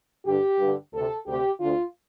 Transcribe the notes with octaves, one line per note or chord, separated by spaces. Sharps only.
G2 D3 G4
G2 D3
D2 C3 A4
D2 C3 G4
D2 D3 F4